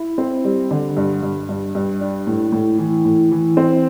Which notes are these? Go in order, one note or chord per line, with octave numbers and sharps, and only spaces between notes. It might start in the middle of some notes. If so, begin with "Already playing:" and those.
Already playing: E4
C4
G3
D3
G2
G2
G2
G2
D4
A2
A2
E3
A2
E3
C4